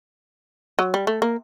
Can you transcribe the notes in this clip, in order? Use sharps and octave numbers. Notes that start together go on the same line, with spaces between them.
F#3
G3
A3
A#3